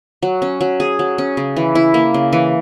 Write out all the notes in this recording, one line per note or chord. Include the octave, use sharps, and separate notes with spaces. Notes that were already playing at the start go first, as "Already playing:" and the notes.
F#3
C#4
F#3
G#4
F#3
C#4
C#3
E3
E4
A#3
C#3
E3